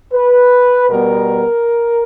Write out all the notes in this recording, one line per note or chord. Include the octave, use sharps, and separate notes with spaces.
B4
B2 G3 B3 A#4